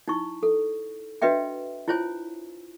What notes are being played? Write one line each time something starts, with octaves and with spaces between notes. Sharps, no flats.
D#4 E4 C#6
A4
D4 F#4 B4 D#5 E5 G5
E4 F4 C5 C#5 G#5